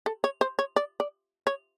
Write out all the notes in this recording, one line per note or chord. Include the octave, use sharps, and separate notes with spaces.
A4
C#5
C5
C#5
D5
D5
C#5